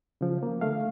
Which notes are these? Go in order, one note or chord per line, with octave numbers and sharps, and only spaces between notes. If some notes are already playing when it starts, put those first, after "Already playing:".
C#3 F3
A#3
D3 A3 F5